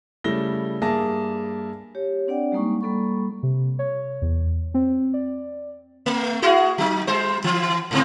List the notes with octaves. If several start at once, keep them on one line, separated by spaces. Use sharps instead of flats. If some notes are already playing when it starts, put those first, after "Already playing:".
C#3 G3 A3 E4 A#6 G7
G2 A#3 G#4 E5 A5 A#6
G4 C#5
C4 D4 D5 F#5 G5
G3 G#3 A#3 D#4 C#6
G3 A#3 A4 B5 C#6
C3
C#5
E2
C4
D5
A3
E4 F#4 G#4
F#3 D#4
G3 C5
E3
G#2 C#3 C4